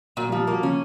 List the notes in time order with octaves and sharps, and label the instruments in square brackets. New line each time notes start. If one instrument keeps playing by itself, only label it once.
[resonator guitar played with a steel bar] A#2 [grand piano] F#3
[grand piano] G3
[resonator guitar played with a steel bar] F3
[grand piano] G3
[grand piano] F#3 [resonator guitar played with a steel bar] A#3
[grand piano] C#3 [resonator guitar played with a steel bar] C#4